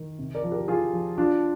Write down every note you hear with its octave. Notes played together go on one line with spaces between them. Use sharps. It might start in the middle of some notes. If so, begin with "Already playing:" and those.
Already playing: D#3
C3
A#4 D5
F3
G4 A#4
F3 F4 G#4
F3
F3 D4 F4